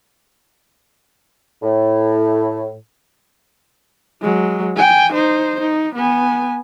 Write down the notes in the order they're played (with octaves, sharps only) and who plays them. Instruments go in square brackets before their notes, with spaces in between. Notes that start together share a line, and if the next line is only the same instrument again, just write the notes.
[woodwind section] A2
[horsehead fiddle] F#3 G#3
G5 G#5
D#4 C5
D#4
B3 G#5